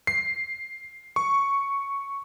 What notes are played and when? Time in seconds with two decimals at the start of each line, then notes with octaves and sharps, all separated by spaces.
0.07 C7
1.16 C#6